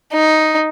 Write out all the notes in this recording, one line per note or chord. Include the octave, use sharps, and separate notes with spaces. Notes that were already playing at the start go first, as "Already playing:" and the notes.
D#4